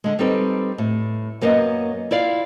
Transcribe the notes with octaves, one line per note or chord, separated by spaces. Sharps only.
D3 G#3
G3 C4 D#4 A4 B4
A2
F#2 A#3 B3 C#4 D#5
E4 F4 D5 F5